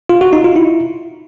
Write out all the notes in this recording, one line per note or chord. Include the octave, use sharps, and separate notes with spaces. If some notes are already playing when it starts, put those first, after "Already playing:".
F4
F#4
D#4
F4
E4